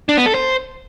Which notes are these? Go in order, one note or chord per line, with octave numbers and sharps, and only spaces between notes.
D4
B3
A4
C5